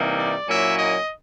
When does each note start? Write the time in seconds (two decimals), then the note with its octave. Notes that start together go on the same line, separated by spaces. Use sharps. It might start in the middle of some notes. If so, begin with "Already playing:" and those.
Already playing: C3 E3 G3 A#3 D#4
0.17 D5
0.47 A#2 F#3 A#3 C#4 E4 E5
0.78 D#5